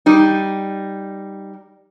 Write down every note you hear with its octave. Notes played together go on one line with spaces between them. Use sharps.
G3 D#4